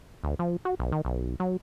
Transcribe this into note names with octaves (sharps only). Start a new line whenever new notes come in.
D2
F3
F#4
B1
D#3
B1
F#3